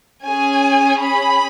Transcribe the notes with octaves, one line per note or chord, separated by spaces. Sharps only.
C#4 G#4 G#5
B5